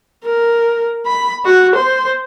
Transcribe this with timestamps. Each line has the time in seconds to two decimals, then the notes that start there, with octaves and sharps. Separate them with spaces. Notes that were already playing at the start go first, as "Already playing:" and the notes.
0.25 A#4
1.07 B5
1.45 F#4
1.75 C5